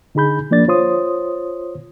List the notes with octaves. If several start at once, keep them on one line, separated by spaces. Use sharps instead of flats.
D3 D#4 G#4 B5 G6
F3 A#3 D4 D5 A6
F4 C5 C#5 C6 D#6